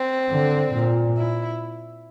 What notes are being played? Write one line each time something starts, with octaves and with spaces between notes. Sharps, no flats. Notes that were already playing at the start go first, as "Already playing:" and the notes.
Already playing: C4
D3
A#2
E4